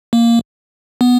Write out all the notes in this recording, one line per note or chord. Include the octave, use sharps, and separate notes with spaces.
A#3
B3